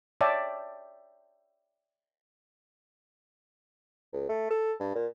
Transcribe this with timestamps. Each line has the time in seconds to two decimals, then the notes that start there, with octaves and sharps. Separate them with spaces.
0.21 C#5 D5 E5 G5 A5
4.13 C#2
4.29 A3
4.50 A4
4.80 G2
4.95 A#2